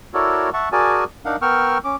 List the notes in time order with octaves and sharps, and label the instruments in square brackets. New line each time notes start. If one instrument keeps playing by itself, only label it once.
[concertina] E4 F#4 A4 A#4 C#5 D5
E5 F#5 A5 C#6
F#4 G#4 A#4 D5 G#5 A5
D4 D#4 A#4 F5 F#5
B3 A#4 G5 C#6 E6 F6
C#4 D6